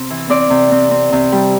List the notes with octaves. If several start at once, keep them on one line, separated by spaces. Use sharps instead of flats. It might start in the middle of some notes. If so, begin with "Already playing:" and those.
Already playing: C3 C4
E3
C4 D5
C3
C4
C4
C3
G3